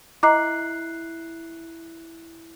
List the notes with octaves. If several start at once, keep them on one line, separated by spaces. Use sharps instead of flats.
E4 D#5 A#5 D6 F#6 C7